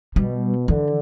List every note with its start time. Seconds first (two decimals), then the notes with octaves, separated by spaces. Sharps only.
0.16 B2 G3
0.68 D3 E3